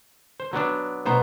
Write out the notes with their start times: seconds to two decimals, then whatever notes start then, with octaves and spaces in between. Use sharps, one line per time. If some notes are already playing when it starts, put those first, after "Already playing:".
0.40 C5
0.53 F#3 B3 D4
1.06 B2 F#3 B3 C5 A#5